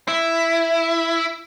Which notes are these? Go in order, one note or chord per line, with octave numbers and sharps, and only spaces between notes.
E4